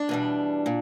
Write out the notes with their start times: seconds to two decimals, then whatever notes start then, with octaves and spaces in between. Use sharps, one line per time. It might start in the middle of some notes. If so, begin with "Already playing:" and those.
Already playing: D4
0.09 E2 B2 G3
0.66 A#2